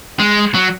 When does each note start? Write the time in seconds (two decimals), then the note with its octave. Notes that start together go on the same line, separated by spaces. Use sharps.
0.19 G#3
0.55 F#3